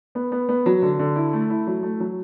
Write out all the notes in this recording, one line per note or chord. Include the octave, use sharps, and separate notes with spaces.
B3
B3
B3
F#3
D3
D3
E4
A3
E4
F#3
A3
F#3